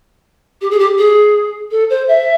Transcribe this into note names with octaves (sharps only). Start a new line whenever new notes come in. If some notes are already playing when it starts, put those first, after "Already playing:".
G4
G#4
G4
G#4
A4
C5
E5